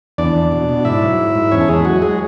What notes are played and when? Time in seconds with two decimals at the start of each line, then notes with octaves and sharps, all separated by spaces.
0.18 E2 D4 D5
0.36 E2
0.52 B2
0.69 B2
0.85 G#2 E4 E5
1.02 F#3
1.18 G#2
1.35 G#2
1.52 E2 C#4 C#5
1.61 A4
1.68 E2 G#3 G#4
1.85 F#3 F#4
2.02 F#3 G#3 G#4